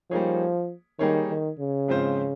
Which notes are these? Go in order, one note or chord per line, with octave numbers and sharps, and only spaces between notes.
F3 G3 A#3 D#4 G#4 C#5
D#3 G3 A#3 D#4 G#4 C#5
D#3
C#3
G#2 F3 C4 F4 C5